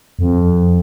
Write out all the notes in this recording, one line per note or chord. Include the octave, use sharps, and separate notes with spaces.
F2